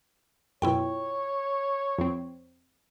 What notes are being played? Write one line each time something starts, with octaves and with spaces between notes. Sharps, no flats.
F#2 B2 E4 F4 C#5 G5
F2 C4